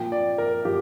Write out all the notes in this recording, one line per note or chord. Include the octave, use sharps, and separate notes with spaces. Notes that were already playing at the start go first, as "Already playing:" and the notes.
Already playing: A#2 F3 G5
D5
A#4
F3 G4